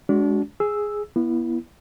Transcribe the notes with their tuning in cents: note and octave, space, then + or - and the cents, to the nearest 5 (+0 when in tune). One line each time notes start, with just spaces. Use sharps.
G#3 +15 D4 -30 F#4 +15
G#4 +0 E6 +0
B3 -30 E4 +10